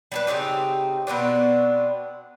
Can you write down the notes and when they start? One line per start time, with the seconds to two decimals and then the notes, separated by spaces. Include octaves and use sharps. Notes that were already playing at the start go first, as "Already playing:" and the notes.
0.12 G3 D4 B4
0.27 C#3 C4 D#4 G4
1.07 B2 B3 C4 D4